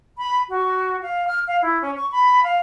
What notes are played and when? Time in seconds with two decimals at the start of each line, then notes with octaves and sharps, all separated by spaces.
0.18 B5
0.49 F#4
1.02 F5
1.27 F6
1.47 F5
1.62 E4
1.82 C#4
1.97 C#6
2.12 B5
2.43 F5